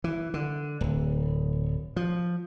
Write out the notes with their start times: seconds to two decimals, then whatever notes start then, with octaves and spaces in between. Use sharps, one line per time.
0.04 E3
0.34 D3
0.81 D1
1.96 F3